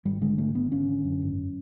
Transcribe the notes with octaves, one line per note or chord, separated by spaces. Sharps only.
G#1 G3
D3 G#3
G#1 A3
D3 B3
G#1 C#4
D3
F#2
G#1